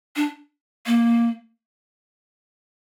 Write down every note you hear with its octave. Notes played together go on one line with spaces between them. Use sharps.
D4
A#3